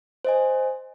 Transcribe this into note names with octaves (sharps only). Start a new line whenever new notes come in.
C5 D#5 G#5